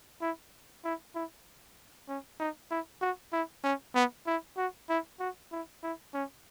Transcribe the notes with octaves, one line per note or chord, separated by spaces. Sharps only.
E4
E4
E4
C#4
D#4
E4
F#4
E4
C#4
B3
E4
F#4
E4
F#4
E4
E4
C#4